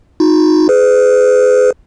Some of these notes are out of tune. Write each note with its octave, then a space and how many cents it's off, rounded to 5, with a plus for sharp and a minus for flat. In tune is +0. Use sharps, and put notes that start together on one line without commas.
D#4 +0 F#4 -45
G#4 +20 B4 +45